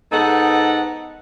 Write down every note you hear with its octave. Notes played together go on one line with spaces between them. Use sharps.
G#2 B3 D#4 A4 F#5